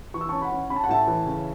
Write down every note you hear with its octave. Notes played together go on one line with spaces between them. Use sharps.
E3 C#6
E6
C#4 A5 C#6
F#5 B5
C#4
C#4 B5
A5
F#5
A2 E5 A5
E3
C#3